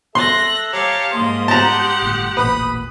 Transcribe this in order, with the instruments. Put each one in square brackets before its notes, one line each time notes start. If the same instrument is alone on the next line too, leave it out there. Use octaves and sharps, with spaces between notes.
[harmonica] A4 E5 [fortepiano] C6 [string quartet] F#6 A#6
[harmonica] G4 A#5 [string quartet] C#5 F5 A5
[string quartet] G#2 A#3 [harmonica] C6 D#6
[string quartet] G4 F#5 [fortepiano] A5 A#5
[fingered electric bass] G1 A2
[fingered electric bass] E1 A1 A#2 [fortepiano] B4 [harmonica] B5 D#6